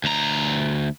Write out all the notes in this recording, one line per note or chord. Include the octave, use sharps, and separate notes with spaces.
D2 A#5